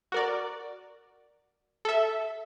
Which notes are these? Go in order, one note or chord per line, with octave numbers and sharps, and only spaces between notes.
F#4 A#4 D5
A4 E5